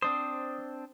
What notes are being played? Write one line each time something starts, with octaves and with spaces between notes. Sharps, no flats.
C4 D4 C5 D#6